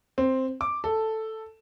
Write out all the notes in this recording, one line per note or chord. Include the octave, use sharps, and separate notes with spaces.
C4
D6
A4